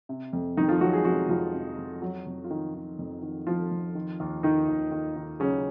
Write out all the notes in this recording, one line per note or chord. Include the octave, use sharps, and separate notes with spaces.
C3
F2
F2 D#3 D#4
F3 F4
F2 F#3 F#4
G#3 G#4
C3 F#3 F#4
F2 F3 F4
C3
F2
F#3 F#4
F2
F4
D#3 D#4
D#3
F2
D#3
F2 F3 F4
F2
D#3
D#2
D#2 D#3 D#4
D#2
D#3
D#3
C#3 F#3 C#4